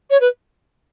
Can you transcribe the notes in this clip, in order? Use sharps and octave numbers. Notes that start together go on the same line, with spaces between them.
C#5
B4